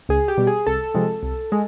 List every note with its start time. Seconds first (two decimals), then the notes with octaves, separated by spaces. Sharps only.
0.09 C#2 G#4
0.28 G4
0.38 B2 G3
0.47 G#4
0.67 C2 A4
0.94 C3 F3 G#3
1.23 C2
1.52 G#3